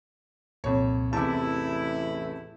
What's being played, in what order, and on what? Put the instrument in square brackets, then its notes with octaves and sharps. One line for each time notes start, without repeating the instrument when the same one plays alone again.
[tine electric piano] C2 A#2 [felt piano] F2 C#5
[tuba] A1 [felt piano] E2 C3 D6 [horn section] E4 [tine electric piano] A5